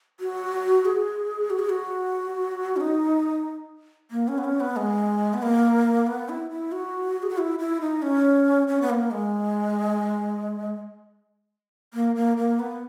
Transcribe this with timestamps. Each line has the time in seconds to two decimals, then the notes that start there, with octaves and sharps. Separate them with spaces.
0.20 F#4
0.85 G#4
1.50 F#4
1.59 G#4
1.69 F#4
2.76 C#4
2.81 D#4
4.11 A#3
4.28 C#4
4.38 B3
4.44 C#4
4.60 B3
4.76 G#3
5.34 B3
5.42 A#3
6.07 B3
6.29 E4
6.51 E4
6.72 F#4
7.23 G#4
7.30 F#4
7.38 E4
7.59 E4
7.81 D#4
8.02 C#4
8.68 C#4
8.82 B3
8.90 A#3
9.11 G#3
11.94 A#3
12.16 A#3
12.37 A#3
12.59 B3